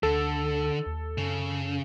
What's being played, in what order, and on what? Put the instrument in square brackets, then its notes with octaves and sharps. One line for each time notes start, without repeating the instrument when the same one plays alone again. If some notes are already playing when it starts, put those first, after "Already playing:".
[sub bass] D2 [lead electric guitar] D3 [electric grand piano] A4
[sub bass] D#2
[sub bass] F#2 [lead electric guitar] C#3